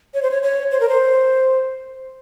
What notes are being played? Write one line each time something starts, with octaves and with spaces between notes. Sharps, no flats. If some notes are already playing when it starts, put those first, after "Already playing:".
C#5
C5
C#5
C#5
C5
A#4
C5